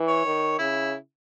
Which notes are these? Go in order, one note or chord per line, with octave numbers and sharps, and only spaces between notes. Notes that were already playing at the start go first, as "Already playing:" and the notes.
Already playing: E3
C#5
D#3
C#3 E4